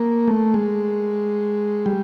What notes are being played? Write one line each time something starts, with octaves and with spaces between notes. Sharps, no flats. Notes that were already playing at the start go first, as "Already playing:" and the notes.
Already playing: A#3
A3
G#3
G3